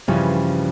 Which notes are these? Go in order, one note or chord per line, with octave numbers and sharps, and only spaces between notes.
G2 C#3 E3 F3 G3 C#4